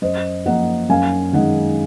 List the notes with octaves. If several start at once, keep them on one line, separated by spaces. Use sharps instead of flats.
F#2 C5 D#5
F3 A#3 D#5 F#5
F#2 F5 G#5
D#3 G#3 D#5 F#5